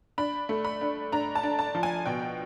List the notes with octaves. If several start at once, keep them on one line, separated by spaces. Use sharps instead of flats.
D4 B5
A3
B5
D4
D4 A#5
A5
D4
A5
F3
G#5
B2 G5